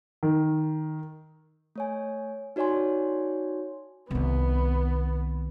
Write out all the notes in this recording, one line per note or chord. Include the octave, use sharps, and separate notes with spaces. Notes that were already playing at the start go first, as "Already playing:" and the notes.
D#3
A3 C#5 G#5
D#4 F#4 C#5 D5 G#5 C6
C2 D#3 B3